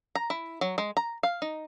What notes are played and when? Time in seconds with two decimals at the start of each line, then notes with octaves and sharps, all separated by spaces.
0.15 A#5
0.30 E4
0.61 F#3
0.78 G#3
0.97 A#5
1.23 F5
1.42 D#4